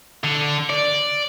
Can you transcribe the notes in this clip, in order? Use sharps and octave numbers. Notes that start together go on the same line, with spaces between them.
D3
D5